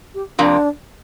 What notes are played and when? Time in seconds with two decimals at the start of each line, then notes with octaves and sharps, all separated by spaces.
0.14 G4
0.38 F2 C3 A#3 D4